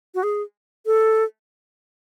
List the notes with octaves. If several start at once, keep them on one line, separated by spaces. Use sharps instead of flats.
F#4
G#4
A4